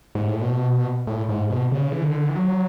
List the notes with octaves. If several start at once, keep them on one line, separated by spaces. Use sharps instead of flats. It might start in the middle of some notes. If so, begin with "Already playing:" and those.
G#2
A2
B2
A2
G#2
B2
C#3
E3
D3
E3
F#3